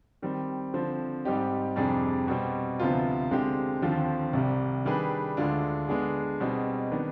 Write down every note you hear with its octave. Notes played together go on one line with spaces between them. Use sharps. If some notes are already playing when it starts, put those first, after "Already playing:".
D#3 G3 C4
D3 F3 C4
G#2 G3 C4 D#4 G4
F2 C3 G3 D4 G#4
B2 G3 C4
D2 C3 F3 B3 F4
D3 G#3 C4 G4
D#2 D3 F3 C4 F4
C2 C3 G3
D#3 G3 D4 G#4 B4
D2 D3 G#3 D4 F4
D3 G#3 B3 D4 G#4
B2 G3 C4 D#4 G#4
D#3 B3 D4